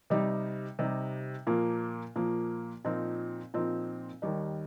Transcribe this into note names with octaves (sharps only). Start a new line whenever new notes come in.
C3 G3 D#4
C3 G3 D#4
A#2 F3 A#3
A#2 F3 A#3
A#2 F3 C4 D#4
A#2 F3 C4 D#4
D#2 D#3 G3 D#4